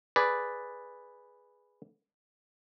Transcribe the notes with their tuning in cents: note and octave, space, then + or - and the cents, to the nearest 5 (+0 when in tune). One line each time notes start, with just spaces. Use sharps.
G#4 +0 B4 +0 D5 +0